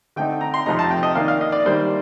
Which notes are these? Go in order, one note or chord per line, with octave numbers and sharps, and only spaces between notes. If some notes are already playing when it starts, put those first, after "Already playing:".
D3 A3 C4 D#4 G5
A#5
C6
F2 C3 F3 A3 D#4 A#5
A5
G5
D#5
D#3 A#3 D4 F5
F5
D#5
D5
D#3 G3 A#3 D4 C5